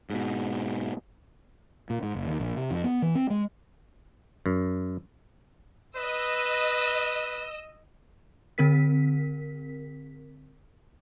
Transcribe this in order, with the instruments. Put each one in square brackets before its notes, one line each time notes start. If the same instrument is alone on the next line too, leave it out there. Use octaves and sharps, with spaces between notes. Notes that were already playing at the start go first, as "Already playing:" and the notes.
[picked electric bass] G#2 B2
[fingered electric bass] A#2
G#2
F#1
D#2
A#1
C3
F2
B3
E3
C4
G#3
[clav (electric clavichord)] F#2
[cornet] B4 [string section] D#5 E6
[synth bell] D3 C4 A#4 B6